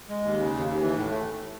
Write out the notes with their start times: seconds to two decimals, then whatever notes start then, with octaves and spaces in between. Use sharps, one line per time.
0.09 G#3
0.23 D#2
0.38 C#3
0.52 D#2
0.66 D#2
0.81 E3
0.96 A2
1.10 A3